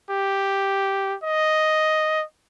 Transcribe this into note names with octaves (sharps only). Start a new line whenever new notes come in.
G4
D#5